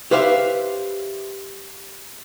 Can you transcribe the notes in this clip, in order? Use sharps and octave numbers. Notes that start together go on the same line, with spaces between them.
G4 B4 C5 E5 F5